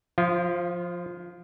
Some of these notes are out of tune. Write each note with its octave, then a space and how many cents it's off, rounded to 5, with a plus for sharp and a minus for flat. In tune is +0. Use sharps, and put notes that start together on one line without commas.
F3 +10 F4 -25